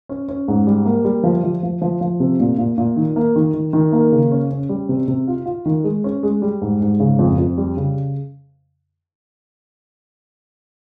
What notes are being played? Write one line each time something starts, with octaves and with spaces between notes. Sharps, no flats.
C#4
C#4
G#2
G3
A#3
G3
F3
F3
F3
F3
F3
C3
A#2
A#2
A#2
D#3
A#3
D#3
D#3
D#3
A#3
C#3
C#4
C#4
G3
C3
C3
F4
F4
D#3
G#3
C#4
G#3
G3
G#2
G#2
C#3
F2
F2
G3
C#3